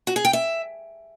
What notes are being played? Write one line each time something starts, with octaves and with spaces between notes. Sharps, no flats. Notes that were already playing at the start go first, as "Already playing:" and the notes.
F#4
G#4
G5
E5